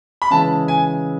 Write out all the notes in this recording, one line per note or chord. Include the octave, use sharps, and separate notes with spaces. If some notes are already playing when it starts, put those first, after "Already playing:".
B5
C#3 E3 G#3 A5
G#5